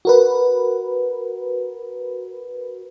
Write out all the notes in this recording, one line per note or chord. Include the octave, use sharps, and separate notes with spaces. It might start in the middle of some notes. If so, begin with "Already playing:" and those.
F#4 A#4 B4